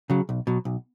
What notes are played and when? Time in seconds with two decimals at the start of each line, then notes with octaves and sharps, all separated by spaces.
0.10 C#3 F#3
0.29 B1
0.47 B2 F#3
0.65 B1